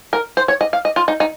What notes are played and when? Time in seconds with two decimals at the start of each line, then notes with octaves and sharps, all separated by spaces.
0.13 A#4
0.37 C5
0.48 C#5
0.61 D#5
0.73 F5
0.85 D#5
0.96 F4
1.08 D#4
1.20 D#4